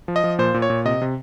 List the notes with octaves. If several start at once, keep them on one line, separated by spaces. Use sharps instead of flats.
F3
D#5
F3
A#2 C5
A#2
C#5
A#2
C3 D#5
C3